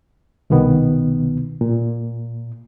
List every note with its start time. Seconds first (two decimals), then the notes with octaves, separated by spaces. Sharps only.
0.50 C2 B2 D#3 B3
1.61 A#2